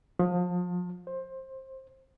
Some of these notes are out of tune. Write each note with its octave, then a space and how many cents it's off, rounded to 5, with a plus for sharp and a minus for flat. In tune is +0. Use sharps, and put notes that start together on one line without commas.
F3 +30
C5 +20